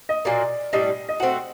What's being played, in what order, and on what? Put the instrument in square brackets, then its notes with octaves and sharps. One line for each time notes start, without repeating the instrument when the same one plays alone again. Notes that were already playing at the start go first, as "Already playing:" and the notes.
[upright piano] D#5
[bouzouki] A#2 F#3 A#3 [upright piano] D5
[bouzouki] A2 G3 D4 [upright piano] D#5
[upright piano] D#5
[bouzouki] A3 C4 F#4 [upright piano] F#5